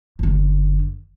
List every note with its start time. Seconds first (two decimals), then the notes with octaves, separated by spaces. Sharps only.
0.19 F#1 D3